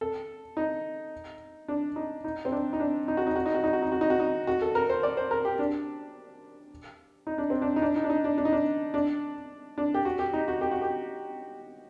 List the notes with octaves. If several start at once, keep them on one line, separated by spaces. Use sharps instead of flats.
A4
D#4
D4
D#4
D#4
C4
D4
D#4
D4
D#4
F#4
D#4
F#4
D#4
F#4
D#4
F#4
D#4
F#4
D#4
F#4
D#4
F#4
A4
A#4
C5
D5
C5
A#4
G4
D4
D#4
D4
C4
D4
D#4
D4
D#4
D4
D#4
D4
D4
D#4
D4
D4
D4
G4
F#4
G4
D#4
F#4
G4
F#4
G4